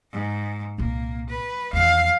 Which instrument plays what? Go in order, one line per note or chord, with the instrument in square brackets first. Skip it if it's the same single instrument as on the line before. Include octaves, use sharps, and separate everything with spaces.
[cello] G#2
[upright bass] C2 A#2 [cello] A#3
[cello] B4
[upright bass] E2 D#3 [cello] F5